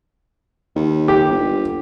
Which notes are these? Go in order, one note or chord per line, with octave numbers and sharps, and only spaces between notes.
D#2
G4
G1